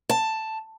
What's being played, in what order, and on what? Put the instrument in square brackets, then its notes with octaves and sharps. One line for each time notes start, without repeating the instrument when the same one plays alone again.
[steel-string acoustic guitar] A5